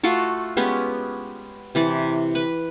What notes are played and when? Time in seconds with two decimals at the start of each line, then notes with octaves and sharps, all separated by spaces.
0.04 A3 F4 F#4 A4
0.57 G#3 B3 C#4 G4
1.75 C3 E3 D5
2.35 B4